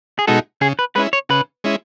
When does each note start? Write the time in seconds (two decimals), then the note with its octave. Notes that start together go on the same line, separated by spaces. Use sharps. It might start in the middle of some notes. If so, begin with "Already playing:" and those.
0.19 G#4
0.27 B2 G#3 D#4 F#4 A4
0.61 C#3 G#4
0.79 B4
0.95 G#3 C#4 E4 B4
1.13 C#5
1.29 C#3 B4
1.64 G#3 C#4 E4